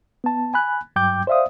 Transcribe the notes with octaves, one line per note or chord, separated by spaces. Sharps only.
B3 A5
G#5 B5 F#6
G2 F#3 G5 D6 G6
C5 D5 E5 F5 D#6